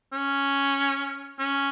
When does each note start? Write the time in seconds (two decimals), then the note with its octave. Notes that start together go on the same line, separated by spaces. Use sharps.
0.13 C#4
1.39 C#4